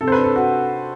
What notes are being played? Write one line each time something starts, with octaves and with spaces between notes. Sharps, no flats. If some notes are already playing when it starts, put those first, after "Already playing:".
C3 A4
C5
B4
D4
A4
F#4